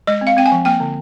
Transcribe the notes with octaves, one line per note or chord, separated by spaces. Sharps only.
G#3 D#5
C4
F5
C4 G5
G#5
F3
A#3 G5
D3